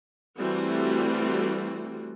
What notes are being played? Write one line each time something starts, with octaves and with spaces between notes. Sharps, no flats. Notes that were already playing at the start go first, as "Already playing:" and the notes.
E3 G3 A3 C4 F#4